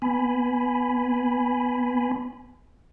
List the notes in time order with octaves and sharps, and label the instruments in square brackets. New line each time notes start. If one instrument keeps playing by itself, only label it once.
[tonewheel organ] B3 G#5 B5